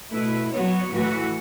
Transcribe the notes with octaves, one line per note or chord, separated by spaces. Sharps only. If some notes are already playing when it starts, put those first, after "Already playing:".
B2 A3 E4 B4
F#3 B3 F#4 C#5
A2 E3 A3 F#4 B4